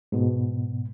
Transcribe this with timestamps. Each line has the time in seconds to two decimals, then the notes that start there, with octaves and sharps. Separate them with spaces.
0.12 G#2 B2